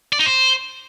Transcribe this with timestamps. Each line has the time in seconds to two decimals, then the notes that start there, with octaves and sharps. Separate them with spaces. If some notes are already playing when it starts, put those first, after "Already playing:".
0.13 D5
0.19 D#4
0.26 C5